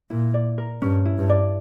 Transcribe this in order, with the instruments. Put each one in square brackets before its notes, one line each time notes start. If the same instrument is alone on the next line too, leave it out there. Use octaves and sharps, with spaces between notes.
[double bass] A#2 [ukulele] E4
[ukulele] D5
A#4
[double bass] G2 [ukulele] C#4
[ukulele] E4
[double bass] G2
[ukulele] D5